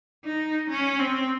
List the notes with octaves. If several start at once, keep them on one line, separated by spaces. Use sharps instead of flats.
D#4
C#4
C4